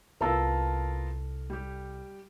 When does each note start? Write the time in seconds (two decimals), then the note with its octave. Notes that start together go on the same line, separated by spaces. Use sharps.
0.21 C2 B3 F4 A4 A#4
1.50 G3 G4